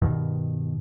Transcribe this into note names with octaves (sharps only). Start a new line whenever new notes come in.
G2 B2 D#3